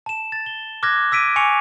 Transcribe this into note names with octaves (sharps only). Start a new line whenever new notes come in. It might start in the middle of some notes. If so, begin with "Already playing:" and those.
A5 E7
A6
G7
D6 F6 F#6 G#6 A#6
D6 E6 B6 D7 D#7
G#5 C#6 D6 C#7 F7